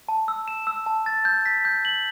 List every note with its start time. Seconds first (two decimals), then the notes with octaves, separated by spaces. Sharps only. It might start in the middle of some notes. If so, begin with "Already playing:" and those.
0.09 A5
0.28 E6
0.48 E7
0.67 E6
0.86 A5
1.06 A6
1.25 G6
1.46 B6
1.65 G6
1.85 F#7